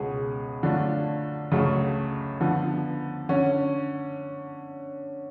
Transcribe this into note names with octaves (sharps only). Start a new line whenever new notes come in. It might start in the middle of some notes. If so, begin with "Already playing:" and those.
Already playing: C#2 B2 G#3 C#4 G#4
D3 F#3 A3 D4 F4
C#2 C#3 F#3 A3
D3 F3 B3
D3 C#4